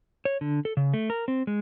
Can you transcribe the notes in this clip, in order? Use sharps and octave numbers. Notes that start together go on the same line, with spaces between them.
C#5
D3
A4
C#3
A3
A#4
C4
G#3